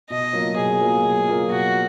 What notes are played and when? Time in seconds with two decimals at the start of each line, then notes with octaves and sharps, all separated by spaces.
0.10 B2 D#5
0.33 F#3 A#3 F4
0.57 B2 G#4
0.81 F#3 A#3 F4
1.04 B2
1.28 F#3 A#3 F4
1.51 B2 F#4